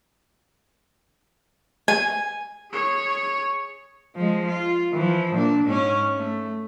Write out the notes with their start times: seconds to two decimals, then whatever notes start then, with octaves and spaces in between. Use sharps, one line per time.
1.88 G#5
2.71 G#4 C#5
4.16 F3 G#3
4.47 F4
4.93 E3 F3
5.35 A#2 D4
5.66 G#2 C#4
6.16 A3